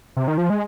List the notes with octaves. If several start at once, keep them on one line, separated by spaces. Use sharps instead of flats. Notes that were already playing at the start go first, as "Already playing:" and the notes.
C3
D#3
F3
G#3